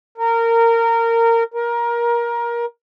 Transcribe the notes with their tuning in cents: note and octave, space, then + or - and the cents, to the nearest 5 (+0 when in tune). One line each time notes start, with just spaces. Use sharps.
A#4 -20
A#4 +20